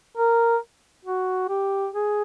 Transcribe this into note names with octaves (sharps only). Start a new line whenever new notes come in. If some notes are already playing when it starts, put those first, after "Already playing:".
A#4
F#4
G4
G#4